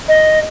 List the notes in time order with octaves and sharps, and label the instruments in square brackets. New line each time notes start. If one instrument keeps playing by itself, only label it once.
[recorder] D#5